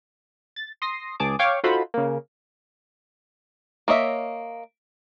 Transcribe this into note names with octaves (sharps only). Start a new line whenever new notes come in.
A6
C6 D#6 A#6 C7
C#2 G#4 A5 D6
C#5 F5 G5 C#6 D6
D#4 F4 F#4 A4 C5 B5
C#3 A#3
A#3 C#5 D#5 E5